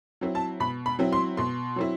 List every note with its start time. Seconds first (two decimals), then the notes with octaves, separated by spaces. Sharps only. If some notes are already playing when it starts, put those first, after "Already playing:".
0.21 F#3 C4 E4
0.35 A5
0.60 B2 B5
0.86 B5
0.99 F#3 C4 E4
1.13 C6
1.37 B2 C6
1.76 F#3 C4 E4